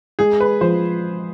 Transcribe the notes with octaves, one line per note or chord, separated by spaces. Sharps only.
G#3 G#4
B4
F3 C5